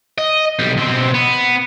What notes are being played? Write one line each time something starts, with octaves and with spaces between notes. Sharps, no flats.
D#5
B1 G3
B2 C4
B3